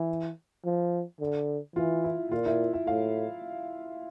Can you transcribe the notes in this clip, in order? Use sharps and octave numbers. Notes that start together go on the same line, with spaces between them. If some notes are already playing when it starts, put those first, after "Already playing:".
Already playing: E3
F3
D3
E3 F4
E4
A#2 F4
E4
E5
A2 F5